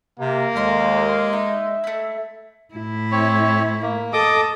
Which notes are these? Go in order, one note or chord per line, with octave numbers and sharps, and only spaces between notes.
C3 A#3
D#2 G#3 A3 C6
D#4 E5
A3 E4
A2 E4
C4 C#5
A#3
A4 D#5 D6 D#6